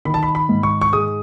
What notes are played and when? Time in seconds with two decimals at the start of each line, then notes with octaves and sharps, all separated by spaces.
0.05 D#3 B5
0.14 A5
0.23 B5
0.35 B5
0.49 G#2
0.63 C#6
0.81 C#6
0.93 G#3 D#6